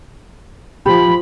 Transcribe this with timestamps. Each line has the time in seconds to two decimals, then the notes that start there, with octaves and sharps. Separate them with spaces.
0.86 F3 G4 B5